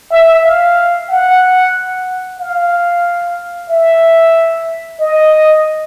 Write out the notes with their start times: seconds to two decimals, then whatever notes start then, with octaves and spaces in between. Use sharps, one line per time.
0.11 E5
0.43 F5
1.09 F#5
2.39 F5
3.70 E5
5.00 D#5